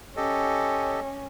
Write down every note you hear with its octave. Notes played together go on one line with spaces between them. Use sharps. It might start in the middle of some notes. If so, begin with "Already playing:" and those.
C#4 G4 A4 D#5